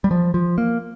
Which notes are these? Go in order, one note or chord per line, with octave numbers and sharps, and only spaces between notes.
G3
F3
F3
A#3